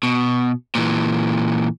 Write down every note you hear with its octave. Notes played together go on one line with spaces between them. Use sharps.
B2
A#2 E3